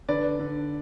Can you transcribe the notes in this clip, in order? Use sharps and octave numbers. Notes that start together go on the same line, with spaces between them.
D3 B4 D5
D3